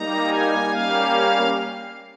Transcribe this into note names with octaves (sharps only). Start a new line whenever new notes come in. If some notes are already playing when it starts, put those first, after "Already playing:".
Already playing: G3 A#3 D#4 A#5
G#5
G3 A#3 C#4 F5